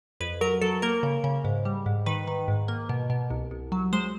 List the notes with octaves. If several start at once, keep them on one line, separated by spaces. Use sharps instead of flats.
F2 B4
F#3 A#4
F#3 A4
A#3 A#4
C#3
C#3
G#2
G3
G#2
D#3 B4
D#3
G#2
A#3
B2
B2
C2
C2
F#3
G#3 C5